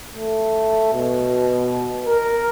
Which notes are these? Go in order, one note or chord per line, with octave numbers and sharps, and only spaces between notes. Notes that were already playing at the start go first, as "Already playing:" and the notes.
A3
B2
A#4